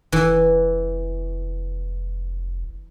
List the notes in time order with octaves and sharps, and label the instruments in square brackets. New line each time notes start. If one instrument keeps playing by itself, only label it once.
[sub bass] F1 [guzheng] E3